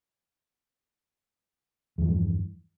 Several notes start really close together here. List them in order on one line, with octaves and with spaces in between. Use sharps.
E2 E3 F3 G2